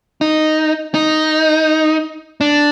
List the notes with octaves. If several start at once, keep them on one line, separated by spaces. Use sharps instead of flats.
D#4
D#4
D4